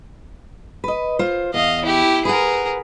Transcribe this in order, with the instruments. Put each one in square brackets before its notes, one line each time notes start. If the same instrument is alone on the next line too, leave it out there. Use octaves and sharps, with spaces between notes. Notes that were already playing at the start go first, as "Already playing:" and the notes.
[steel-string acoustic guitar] B4 D#5
F4 C5
[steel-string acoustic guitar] E2 [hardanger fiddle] D#5 F5
[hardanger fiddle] E4 G4
[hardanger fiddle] G#4 A#4 [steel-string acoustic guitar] B4 F#5